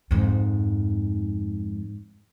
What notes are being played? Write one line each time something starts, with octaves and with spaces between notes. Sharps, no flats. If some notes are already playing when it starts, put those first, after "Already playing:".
F2 G#2